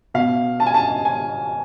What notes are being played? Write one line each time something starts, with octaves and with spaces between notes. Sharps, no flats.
B2 F5
A5
G#5
A5
G#5